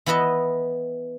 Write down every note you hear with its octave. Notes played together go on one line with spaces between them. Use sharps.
E3 B3 E4 B4 D#5